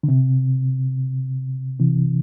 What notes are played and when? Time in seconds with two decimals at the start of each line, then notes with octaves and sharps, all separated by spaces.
0.03 D3
0.08 C3
1.79 C3 E3